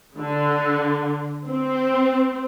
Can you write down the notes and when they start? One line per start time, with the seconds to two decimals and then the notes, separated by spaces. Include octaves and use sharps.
0.19 D3
1.47 C4